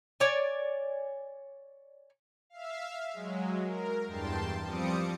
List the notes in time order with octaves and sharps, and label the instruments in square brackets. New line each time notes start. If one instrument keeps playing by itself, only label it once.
[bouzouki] C#5 D5 G#5
[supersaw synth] E5 F5
F#3 G#3
A#4
E2 G2 G5 A5 C6
F3 G3 C4 D6 D#6 C#7